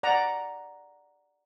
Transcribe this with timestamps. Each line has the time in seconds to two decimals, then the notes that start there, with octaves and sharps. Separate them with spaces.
0.03 D5 F#5 A#5